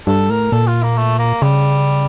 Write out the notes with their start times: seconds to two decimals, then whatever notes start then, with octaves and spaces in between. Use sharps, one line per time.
0.07 G2 A4
0.30 A2 A#4
0.52 A#2 A4
0.67 F4
0.83 A#3
0.97 A3
1.19 A#3
1.42 C#3 G3